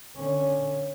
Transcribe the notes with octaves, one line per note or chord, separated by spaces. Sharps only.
D3 C#4